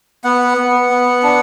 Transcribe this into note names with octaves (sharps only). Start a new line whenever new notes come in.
B3 F#5
B3
B3
D4